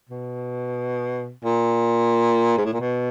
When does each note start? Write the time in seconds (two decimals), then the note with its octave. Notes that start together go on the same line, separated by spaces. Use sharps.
0.09 B2
1.45 A#2
2.58 G#2
2.65 A2
2.73 A#2
2.80 B2